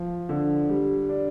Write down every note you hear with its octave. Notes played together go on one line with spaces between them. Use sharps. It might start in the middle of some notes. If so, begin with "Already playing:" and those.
Already playing: F3
D3
G3
D4